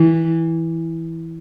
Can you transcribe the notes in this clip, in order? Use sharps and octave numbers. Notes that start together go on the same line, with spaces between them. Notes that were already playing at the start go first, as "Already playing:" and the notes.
Already playing: E3